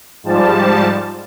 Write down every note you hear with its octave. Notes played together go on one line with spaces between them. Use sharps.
G#2 F3 G3 A5